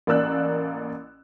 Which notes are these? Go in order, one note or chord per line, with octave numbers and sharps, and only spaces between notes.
A1 A#3 D5 E6 F#6